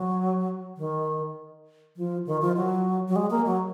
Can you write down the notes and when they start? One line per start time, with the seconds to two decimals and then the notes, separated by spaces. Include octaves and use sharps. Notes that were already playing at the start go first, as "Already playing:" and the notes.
Already playing: F#3
0.77 D#3
1.97 F3
2.27 D#3
2.42 F3
2.56 F#3
3.08 F#3
3.16 G#3
3.30 A#3
3.46 F#3